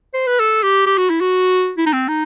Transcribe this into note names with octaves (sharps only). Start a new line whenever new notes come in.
C5
B4
A4
G4
G4
F#4
E4
F#4
E4
D#4
C4
D#4